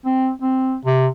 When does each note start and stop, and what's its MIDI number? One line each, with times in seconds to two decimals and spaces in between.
0.06 0.31 60
0.42 0.75 60
0.85 1.07 48